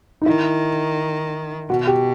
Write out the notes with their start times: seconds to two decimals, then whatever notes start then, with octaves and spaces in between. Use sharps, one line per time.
0.22 D#4
0.26 D#3 E4
1.70 B2 F#4
1.87 G4